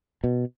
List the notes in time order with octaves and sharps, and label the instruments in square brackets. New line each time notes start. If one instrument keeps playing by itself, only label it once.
[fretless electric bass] B2